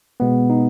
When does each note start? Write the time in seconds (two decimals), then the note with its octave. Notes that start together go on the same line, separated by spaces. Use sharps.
0.20 B2 G#3 B3
0.50 D#4